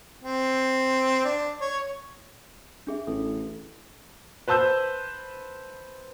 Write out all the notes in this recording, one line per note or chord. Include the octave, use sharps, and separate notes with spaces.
C4
D4
C#5
D4 G#4 E5
A1 A4
B4 C5 A5 E6 G6